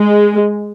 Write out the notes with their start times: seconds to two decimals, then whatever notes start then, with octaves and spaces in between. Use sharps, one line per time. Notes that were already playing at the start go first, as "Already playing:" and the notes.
Already playing: G#3